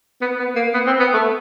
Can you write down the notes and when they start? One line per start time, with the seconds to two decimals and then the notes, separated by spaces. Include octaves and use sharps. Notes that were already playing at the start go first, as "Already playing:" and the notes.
0.21 B3
0.39 B3
0.56 A#3
0.74 B3
0.87 C4
1.00 B3
1.14 A3